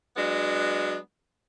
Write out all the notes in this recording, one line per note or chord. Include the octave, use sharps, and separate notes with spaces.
F#3 G#3 B3 D4